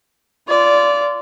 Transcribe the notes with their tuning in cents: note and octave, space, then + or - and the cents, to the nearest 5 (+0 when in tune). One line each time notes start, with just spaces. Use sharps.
F4 -20 D5 -20